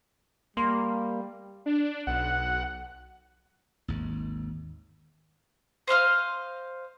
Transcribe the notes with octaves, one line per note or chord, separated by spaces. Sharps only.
G3 A#3 C6
D4
B1 F#5
G#1 D#2
C5 D#5 F5 F6